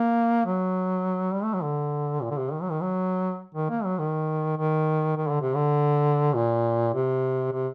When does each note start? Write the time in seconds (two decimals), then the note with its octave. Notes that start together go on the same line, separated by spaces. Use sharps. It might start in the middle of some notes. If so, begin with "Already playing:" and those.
Already playing: A#3
0.45 F#3
1.34 G3
1.44 A3
1.54 F#3
1.63 D3
2.22 A#2
2.31 D3
2.37 C3
2.52 D#3
2.62 F#3
2.71 D#3
2.81 F#3
3.55 D#3
3.70 A#3
3.85 F#3
3.99 D#3
4.58 D#3
5.17 D#3
5.29 D3
5.41 C3
5.55 D3
6.35 A#2
6.94 C3
7.53 C3